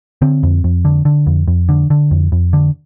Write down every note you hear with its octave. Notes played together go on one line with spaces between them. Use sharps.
D3 C4
F2
F2
D3
D3
F2
F2
D3
D3
F2
F2
D3